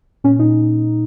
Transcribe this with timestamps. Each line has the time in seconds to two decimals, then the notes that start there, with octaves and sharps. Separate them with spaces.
0.24 A#2 C#4
0.39 A#2 D#4